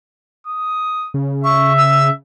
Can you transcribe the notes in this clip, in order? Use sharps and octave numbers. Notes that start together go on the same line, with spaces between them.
D#6
C#3
E5 C#6
E6